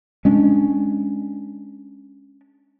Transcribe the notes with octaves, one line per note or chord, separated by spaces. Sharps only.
G#3 C#4 D4